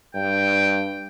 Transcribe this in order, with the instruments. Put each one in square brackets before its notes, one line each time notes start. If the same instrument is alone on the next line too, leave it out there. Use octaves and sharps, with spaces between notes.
[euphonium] G2 [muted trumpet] G5